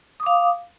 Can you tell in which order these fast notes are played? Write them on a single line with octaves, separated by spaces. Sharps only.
D#6 D6 F5